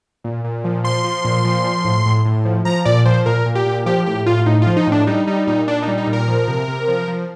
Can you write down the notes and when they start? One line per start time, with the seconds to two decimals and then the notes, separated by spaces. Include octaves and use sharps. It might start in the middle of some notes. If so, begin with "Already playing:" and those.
0.24 A#2
0.44 A#2
0.64 F3
0.84 F3 C6
1.04 F3
1.25 A#2
1.45 F3
1.64 F3
1.84 A2
2.06 A2
2.25 A2
2.45 F3
2.65 F3 A#5
2.85 A#2 D5
3.05 F3 C5
3.26 A#2 A#4
3.46 A#2
3.55 G4
3.66 A#2
3.86 F3 G4
4.06 A2 G4
4.26 A2 F4
4.46 A2 D#4
4.62 F3 F4
4.77 D#4
4.87 A2 D4
5.07 G3 D#4
5.27 G3 D#4
5.47 A#2 D#4
5.67 A#2 D4
5.82 D#4
5.88 G3
5.98 D#4
6.07 A#2
6.13 A#4
6.28 F3
6.48 C3
6.68 C3
6.88 F3
7.08 F3